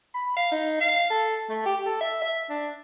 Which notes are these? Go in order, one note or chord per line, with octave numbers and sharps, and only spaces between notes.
B5
F5
D#4
F5
A4
A3
G4
A4
E5
E5
D4